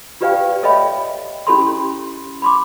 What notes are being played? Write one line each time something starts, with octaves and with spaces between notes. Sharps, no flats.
F4 G4 B4 D5 F5 G5
A4 C#5 D#5 E5 G5 B5
C#4 E4 G4 A4 B5 C6
B5 C6 D6